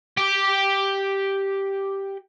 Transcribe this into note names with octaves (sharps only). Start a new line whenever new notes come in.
G4 G5